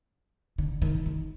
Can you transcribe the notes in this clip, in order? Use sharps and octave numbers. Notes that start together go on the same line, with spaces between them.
D3
D#3
D#3